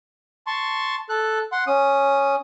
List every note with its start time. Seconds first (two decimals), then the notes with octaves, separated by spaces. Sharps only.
0.47 A5 C6 C#6
1.09 A4 F#6
1.52 F#5 C6
1.67 C#4 D#6